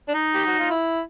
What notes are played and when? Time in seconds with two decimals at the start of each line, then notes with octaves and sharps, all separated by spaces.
0.08 D4
0.14 D#4
0.34 G4
0.46 F#4
0.59 F4
0.70 E4